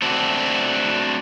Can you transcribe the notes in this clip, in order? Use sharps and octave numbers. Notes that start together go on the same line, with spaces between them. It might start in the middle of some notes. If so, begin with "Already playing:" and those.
A3 C4 D4 F#4